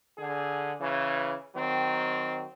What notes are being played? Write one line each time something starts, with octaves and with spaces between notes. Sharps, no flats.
D3 G#4
C#3 E3
D#3 F#3 C4